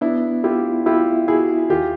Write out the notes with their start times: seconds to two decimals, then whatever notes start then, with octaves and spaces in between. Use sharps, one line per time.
0.01 B3 D4 E4
0.44 E4 F4 G4
0.86 E4 F4 G4
1.28 E4 F#4 G#4
1.70 D#2 F4 G4